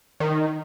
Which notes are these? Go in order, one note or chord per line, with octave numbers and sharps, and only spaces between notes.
D#3